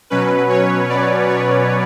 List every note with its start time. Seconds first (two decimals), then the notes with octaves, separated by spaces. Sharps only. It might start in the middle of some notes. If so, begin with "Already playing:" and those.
0.10 B2 F#3 C#4 B4
0.50 C#5
0.89 D5
1.29 C#5